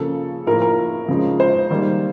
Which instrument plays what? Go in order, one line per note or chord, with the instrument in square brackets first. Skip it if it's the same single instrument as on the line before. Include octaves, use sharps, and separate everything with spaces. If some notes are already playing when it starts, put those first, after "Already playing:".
Already playing: [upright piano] C#3 F3 A#3 A4
A2 F3 A#3 A#4
A#4
C#3 F3 G#3
C5
D#3 G3 A#3